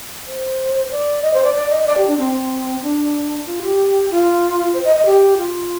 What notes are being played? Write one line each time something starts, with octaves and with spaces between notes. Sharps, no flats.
C5
D5
D#5
C5
D5
D5
D#5
D#5
D5
G4
D4
C4
D4
F4
G4
F4
C5
D#5
D#5
G4
F4